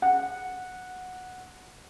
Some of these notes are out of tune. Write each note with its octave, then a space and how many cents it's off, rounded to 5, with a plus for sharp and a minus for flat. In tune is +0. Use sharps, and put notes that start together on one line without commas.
F#5 -10